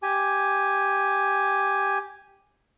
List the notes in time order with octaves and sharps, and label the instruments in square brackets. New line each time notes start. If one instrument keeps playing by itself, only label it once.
[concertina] G4 G#5